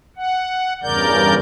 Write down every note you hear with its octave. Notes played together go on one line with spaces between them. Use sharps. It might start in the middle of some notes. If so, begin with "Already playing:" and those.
F#5
E2 G2 C#3 A#4 D5 G6